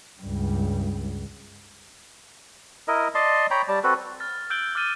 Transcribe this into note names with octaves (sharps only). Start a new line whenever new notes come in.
C#2 G2
E4 A#4 D#5
D5 D#5 A5 C6
C#5 G5 A#5 B5
G3 D5 A5
C4 F#4 A4 B4
F6 A6
E6 F#6 G6 D7 F#7 G7
D6 F6 A6 D#7 G7